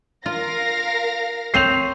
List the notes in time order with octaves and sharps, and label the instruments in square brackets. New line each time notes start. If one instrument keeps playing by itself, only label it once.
[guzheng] F4 [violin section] A#4 F5 A#6
[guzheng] C4 C5 C#5 [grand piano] C7 D#7 F7